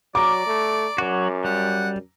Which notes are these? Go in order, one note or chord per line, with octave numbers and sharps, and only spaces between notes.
F#3 D5 A#5 D6
A3
F#2 F#3 F#4
G3 F#5